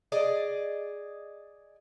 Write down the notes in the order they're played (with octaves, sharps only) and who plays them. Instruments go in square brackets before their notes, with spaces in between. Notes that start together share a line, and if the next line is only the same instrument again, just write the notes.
[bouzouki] G#4 D5 D#5